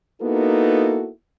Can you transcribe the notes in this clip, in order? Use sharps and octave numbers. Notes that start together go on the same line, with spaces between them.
A#3 B3 D#4 E4 F#4 A4